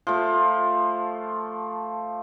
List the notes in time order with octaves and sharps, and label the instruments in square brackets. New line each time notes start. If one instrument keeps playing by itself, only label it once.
[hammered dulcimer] F3 A3